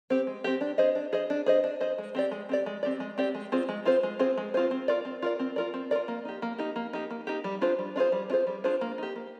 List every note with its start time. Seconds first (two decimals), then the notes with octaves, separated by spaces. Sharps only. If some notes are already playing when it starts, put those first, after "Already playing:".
0.10 C4 G4
0.27 G#3
0.44 C4 G4
0.61 D4
0.78 G#4 C5 D#5
0.95 D4
1.13 G#4 C5 D#5
1.30 D4
1.46 G#4 C5 D#5
1.64 D4
1.81 G#4 C5 D#5
1.98 G#3
2.15 C4 G4 D5
2.31 G#3
2.49 C4 G4 D5
2.66 G#3
2.83 C4 G4 D5
3.00 G#3
3.18 C4 G4 D5
3.35 G#3
3.52 C4 F4 G#4 C5
3.69 G#3
3.85 C4 F4 G#4 C5
4.03 G#3
4.19 C4 F4 G#4 C5
4.38 G#3
4.54 C4 F4 G#4 C5
4.71 C4
4.88 F4 A#4 D5
5.05 C4
5.22 F4 A#4 D5
5.39 C4
5.56 F4 A#4 D5
5.74 C4
5.91 F4 A#4 D5
6.08 A#3
6.25 D#4 G4
6.42 A#3
6.59 D#4 G4
6.76 A#3
6.93 D#4 G4
7.10 A#3
7.27 D#4 G4
7.44 G3
7.61 D4 F4 G#4 C5
7.79 G3
7.96 D4 F4 G#4 C5
8.12 G3
8.30 D4 F4 G#4 C5
8.47 G3
8.64 D4 F4 G#4 C5
8.81 A#3
8.98 D#4 G4
9.16 A#3